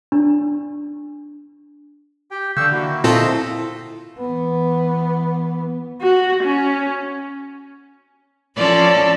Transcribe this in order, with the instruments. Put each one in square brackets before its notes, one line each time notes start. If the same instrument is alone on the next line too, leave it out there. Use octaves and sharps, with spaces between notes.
[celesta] D4
[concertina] G4 G5
[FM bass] D3 [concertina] F5 C#6 E6 [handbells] G6
[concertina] A#3 E4 F#4
[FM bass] A#2 [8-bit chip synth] C4 F4 A4 [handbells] E4 [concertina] D#5 E5 C6
[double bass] E3 B3
[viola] F#4
C#4
[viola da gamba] F3 C#4 [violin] A4 D5